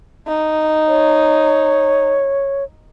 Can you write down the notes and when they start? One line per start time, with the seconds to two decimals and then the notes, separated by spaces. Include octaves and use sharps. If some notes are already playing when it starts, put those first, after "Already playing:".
0.28 D#4
0.88 C#5